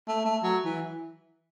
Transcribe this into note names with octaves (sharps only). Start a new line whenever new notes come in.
A3
A3
F#3
E3